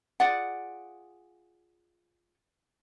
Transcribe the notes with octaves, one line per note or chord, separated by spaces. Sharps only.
F4 G#4 D5 F#5